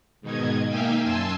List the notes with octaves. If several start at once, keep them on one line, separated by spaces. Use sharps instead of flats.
G#2 B2 D#3 D#4 G#6
A#3 D#4 E5 F5 G5 G#5
F#2 G#5 A5 C6 E6